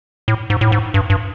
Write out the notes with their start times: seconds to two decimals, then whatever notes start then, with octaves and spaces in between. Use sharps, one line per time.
0.28 A2
0.50 G#2
0.61 A2
0.72 G#2
0.94 G2
1.10 G2